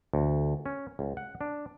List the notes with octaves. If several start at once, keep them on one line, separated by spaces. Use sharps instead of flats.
D2
C#4
C#2
F#5
D4